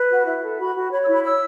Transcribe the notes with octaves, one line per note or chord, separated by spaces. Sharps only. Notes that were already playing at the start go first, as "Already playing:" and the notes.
Already playing: B4
F#4
E4
A4
F#4 B5
F#4
C#5 B5
E6
E4
B5
C#5 E6